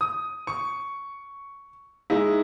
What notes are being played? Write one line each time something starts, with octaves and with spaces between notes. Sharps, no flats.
D#6
C#6
G#3 D#4 E4